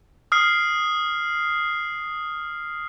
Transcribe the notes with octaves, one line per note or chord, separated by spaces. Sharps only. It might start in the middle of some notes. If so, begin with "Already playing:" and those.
D#6 F6 C7